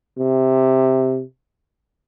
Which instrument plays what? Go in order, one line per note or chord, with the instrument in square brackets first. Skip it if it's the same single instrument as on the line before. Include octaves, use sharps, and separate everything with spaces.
[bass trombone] C3